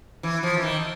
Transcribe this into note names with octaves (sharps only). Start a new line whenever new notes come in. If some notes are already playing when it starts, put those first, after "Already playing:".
E3
F3
E3
D#3